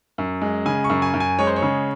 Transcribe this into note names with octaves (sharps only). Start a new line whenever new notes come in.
F#2
G#3
C#3 G#5
C#6
F#2
G#5
F#2
G#5
G#3 C#5
C5
C#5
C#3